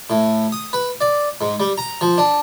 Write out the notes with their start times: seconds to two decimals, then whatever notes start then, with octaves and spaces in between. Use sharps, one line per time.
0.10 A2
0.52 D#6
0.73 B4
1.01 D5
1.41 G#2
1.60 G3
1.78 A#5
2.01 F3
2.18 D4